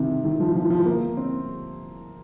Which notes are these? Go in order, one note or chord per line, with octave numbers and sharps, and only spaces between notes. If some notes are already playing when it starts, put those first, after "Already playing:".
Already playing: C3 D#3
D#3
F3
F3
F3
A#3
C4